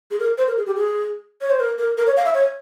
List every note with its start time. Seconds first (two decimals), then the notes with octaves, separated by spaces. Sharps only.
0.11 G#4
0.20 A#4
0.38 C5
0.48 A#4
0.57 G#4
0.66 G4
0.76 G#4
1.41 C#5
1.50 C5
1.60 A#4
1.78 A#4
1.97 A#4
2.07 C#5
2.17 F5
2.26 E5
2.34 C#5